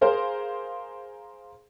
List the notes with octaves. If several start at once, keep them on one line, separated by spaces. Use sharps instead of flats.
G#4 A#4 C5 F5